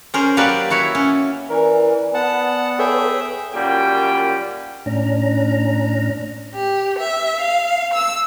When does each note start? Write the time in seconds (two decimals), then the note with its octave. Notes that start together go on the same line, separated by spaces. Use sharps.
0.14 C#4 G#4 A#4 C5
0.37 F#3 A#3 G4 A#4 B4 D5
0.70 E4 F#4 C#5 E5
0.95 C#4
1.50 E3 A#4 D5 G#5
2.14 B3 F#5 A5
2.79 G#4 A4 B4 C#5 E5 G5
3.54 F#2 A#2 C#3 G3 G5
4.86 A2 C#4 D4 A#5
6.54 G4
6.99 E5
7.41 F5
7.93 E6